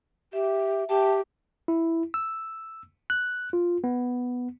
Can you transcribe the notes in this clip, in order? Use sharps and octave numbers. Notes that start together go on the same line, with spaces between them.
G4 E5
G4 E5 G5 A5
E4
E6
F#6
F4
B3